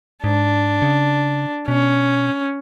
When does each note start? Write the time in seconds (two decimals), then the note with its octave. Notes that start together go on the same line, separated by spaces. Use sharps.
0.24 G#2 D4
0.82 C#3
1.68 B2 C#4